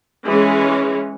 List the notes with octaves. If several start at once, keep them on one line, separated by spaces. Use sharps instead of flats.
E3 G#3 C#4